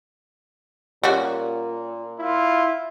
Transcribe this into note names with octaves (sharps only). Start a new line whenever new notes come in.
A#2 G3 C#4 F#4
E4 F4